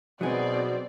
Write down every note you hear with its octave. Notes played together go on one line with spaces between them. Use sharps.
B2 F#3 C4 D#4 G#4 D5